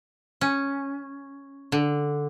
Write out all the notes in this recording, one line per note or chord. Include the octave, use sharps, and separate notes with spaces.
C#4
D3